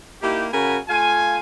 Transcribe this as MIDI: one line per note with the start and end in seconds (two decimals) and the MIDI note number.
0.21 0.47 58
0.21 0.47 63
0.21 0.47 64
0.21 0.47 67
0.53 0.78 49
0.53 0.78 66
0.53 0.78 70
0.53 0.78 80
0.53 0.78 82
0.53 0.78 83
0.88 1.40 57
0.88 1.40 65
0.88 1.40 77
0.88 1.40 80